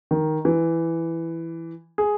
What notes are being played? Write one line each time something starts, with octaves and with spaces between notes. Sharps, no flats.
D#3
E3
G#4